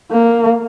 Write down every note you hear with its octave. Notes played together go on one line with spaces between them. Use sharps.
A#3